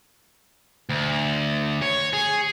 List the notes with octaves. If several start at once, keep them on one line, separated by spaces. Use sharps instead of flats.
D2
C#5
G#4